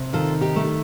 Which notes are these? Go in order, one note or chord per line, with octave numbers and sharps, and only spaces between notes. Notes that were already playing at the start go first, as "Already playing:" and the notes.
Already playing: C3
D#3 F4 A4
D#4 G4
A3